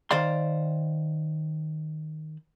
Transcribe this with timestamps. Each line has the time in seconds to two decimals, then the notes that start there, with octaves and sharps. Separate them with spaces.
0.11 D#3 C5 D5 F5 C6